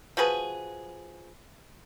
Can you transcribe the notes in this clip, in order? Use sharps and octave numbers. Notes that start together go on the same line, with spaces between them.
F3 F#4 G#4 B4